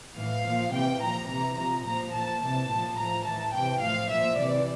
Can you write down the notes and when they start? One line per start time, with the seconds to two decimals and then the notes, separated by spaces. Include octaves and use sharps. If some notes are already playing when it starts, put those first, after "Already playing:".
0.17 A2 E3 F5
0.45 A#2 F3
0.73 C3 E3 G5
1.01 A#2 F3 A#5
1.29 C3 E3 A#5
1.57 C3 F3 A#5
1.86 A#2 F3 A#5
2.13 A#2 F3 A5
2.41 C3 E3 A5
2.70 A#2 F3
2.97 A2 F3 A#5
3.25 A2 E3 A5
3.53 C3 E3 G5
3.81 A2 F3 F5
4.10 A#2 F3 E5
4.37 C3 E3 D5